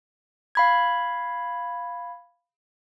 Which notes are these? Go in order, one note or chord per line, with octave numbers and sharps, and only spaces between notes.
F5 B5 G#6